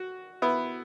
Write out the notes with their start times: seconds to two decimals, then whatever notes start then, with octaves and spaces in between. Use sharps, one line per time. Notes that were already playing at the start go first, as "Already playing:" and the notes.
Already playing: F#4
0.42 B3 E4